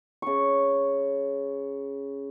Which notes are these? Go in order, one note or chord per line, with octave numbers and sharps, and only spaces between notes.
C#3 C#6